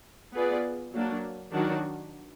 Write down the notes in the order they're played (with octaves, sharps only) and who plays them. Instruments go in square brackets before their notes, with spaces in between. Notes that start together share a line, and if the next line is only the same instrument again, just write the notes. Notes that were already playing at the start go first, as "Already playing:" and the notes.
[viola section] B3 F4 G#4 B4 D5
F#3 A#3 D4
D#3 F#3 D4 F#4